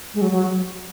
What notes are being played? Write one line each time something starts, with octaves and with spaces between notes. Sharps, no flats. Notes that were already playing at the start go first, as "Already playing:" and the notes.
G#3
F#3
F#3